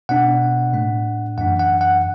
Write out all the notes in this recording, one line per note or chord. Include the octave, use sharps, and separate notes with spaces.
B2 B3 D4 F#5
A2 A3 D4
F#2 E3 D4 F#5
F#5
F#5